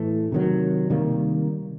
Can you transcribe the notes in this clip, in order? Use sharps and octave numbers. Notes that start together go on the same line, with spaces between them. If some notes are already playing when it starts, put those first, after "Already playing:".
Already playing: A2 E3 A3
C3 D#3 F#3
C3 D#3 G3 A#3